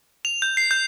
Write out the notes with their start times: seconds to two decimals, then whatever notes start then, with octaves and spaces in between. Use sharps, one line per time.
0.25 F7
0.42 G6
0.57 C7
0.71 G6